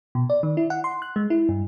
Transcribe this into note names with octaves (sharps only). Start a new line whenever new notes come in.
B2
D5
D#3
E4
F#5
C6
F#6
G#3
E4
G2